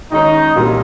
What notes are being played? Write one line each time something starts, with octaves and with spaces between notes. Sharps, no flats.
D#3 G#3 C#4 D#4
C2 A#2 G3 A#3